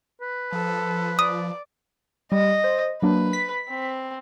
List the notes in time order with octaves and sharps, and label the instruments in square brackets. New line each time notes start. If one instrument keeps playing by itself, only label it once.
[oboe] B4
[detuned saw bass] F3 [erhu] A4
[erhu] D5 [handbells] D#6
[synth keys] G3 [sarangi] D#5
[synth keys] C5
[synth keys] F#3 A#3 D4 [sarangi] B4
[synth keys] B6
[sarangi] C4